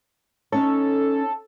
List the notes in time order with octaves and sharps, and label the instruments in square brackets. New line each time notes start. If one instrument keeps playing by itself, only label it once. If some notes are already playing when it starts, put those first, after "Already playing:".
[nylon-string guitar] C#4 D#4 C#5 [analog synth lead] A4